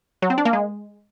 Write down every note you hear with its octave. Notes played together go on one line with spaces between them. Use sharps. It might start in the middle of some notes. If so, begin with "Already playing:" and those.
F#3
C4
D4
A#3
G#3